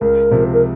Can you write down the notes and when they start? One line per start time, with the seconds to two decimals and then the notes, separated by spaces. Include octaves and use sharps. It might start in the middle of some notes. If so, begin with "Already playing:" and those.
0.01 C#2 A#4
0.31 C3 F3
0.53 A#4